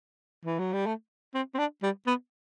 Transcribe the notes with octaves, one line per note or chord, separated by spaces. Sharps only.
E3
F#3
G3
A3
C4
C4
D4
G3
B3